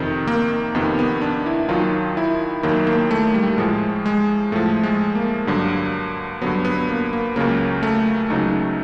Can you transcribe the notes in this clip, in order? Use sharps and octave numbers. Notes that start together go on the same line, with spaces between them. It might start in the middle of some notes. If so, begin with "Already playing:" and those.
Already playing: F2 C3 D#3
A#3
F2 C3 D#3 B3
B3
D4
E4
D#2 D#3 F#3 F4
E4
D#2 D#3 F#3 A#3
A#3
A3
G3
A2 F3 G#3
G#3
A2 F3 A3
G#3
A#3
G2 D3 F#3
G2 D3 F#3 B3
B3
A#3
A#3
C#2 C#3 F#3 A#3
A3
C#2 C#3 F#3 D#4